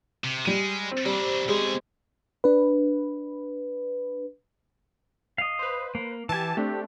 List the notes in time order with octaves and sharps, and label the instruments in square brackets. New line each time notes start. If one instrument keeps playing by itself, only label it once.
[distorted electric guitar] C3
[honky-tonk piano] G3 D#7 [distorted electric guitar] G#3
[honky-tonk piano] C4
[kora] G3 [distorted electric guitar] A#3 D4
[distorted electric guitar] B2 G#4 [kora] G#3 G4
[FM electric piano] D4 B4
[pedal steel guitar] D#5 F5
[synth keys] B4 C5
[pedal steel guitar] A#3
[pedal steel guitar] E3 G#5 [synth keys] G4 A5
[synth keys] A3 C4 D4 [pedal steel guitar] G4